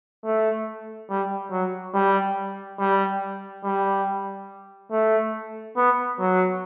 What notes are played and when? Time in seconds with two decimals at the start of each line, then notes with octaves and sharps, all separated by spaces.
0.24 A3
1.10 G3
1.51 F#3
1.94 G3
2.79 G3
3.64 G3
4.91 A3
5.77 B3
6.20 F#3